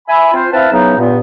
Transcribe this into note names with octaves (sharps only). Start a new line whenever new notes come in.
E5 G#5 B5
C4 F4 C5
C4 E4 B4 E5 F5 A5
C#3 E3 F#3 B3 D#4
G2 A#2 B3